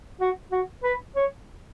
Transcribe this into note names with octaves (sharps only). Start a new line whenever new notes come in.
F#4
F#4
B4
C#5